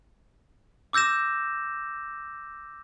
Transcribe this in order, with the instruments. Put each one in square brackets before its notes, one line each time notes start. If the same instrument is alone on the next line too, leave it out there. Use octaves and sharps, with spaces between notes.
[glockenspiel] D6 E6 G6 A#6 E7